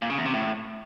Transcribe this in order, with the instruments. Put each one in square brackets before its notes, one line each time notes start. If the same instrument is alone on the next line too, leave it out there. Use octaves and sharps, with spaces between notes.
[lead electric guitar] A#2
C#3
E2
C3
A2